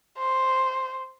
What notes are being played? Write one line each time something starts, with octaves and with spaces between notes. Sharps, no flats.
C5